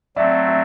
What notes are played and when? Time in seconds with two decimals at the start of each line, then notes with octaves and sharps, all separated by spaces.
0.16 F#3 A3 C4 D5 E5
0.48 D5 E5